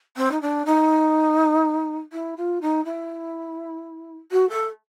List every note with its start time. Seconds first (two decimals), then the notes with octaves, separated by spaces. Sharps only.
0.16 C4
0.31 D#4
0.41 D4
0.65 D#4
2.12 E4
2.37 F4
2.61 D#4
2.85 E4
4.32 F#4
4.49 A4